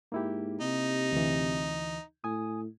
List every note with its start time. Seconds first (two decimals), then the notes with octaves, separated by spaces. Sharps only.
0.12 G#2 A#3 E4 G4
0.61 C3 D#4
1.12 D2 E3
2.24 A2 G#5 D#6